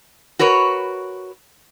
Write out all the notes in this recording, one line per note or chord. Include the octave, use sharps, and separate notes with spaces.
F#4 A#4 B4 C#5